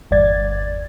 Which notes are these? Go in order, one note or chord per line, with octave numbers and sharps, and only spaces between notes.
G1 E2 G2 D5 G#6 A6